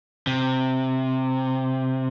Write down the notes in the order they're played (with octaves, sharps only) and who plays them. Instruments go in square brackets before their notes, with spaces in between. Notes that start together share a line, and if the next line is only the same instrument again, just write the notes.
[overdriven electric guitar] C3